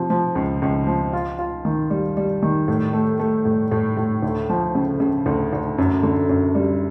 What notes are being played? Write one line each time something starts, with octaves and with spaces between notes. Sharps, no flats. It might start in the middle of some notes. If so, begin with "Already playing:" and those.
Already playing: C3 F3
F3
C#2
C#2
F3
F4
F4
D#3
G3
G3
D#3
A2
A3
A3
A2
A2
A2
D2
F3
C#3
C#3
D2
D2
F#2
D3
F#2
G3